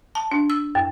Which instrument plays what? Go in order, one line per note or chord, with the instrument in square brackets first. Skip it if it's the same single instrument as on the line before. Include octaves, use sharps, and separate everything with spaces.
[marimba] A5
D4
E6
F#2